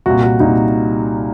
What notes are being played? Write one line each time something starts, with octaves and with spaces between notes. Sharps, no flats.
C2 A#2 F#4
F#4
C2 A#2 D#4